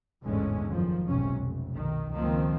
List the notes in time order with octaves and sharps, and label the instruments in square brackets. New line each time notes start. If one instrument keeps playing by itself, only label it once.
[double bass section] A1 E2 G#2 D3 G#3 C#4
F#1 D#3 F3
F1 B1 G#2 C3 C#4
F1
B1 D#3
C#2 D#3 F3 A#3 C4